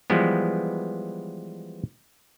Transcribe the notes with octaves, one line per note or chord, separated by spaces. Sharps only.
E3 F3 G3 G#3 B3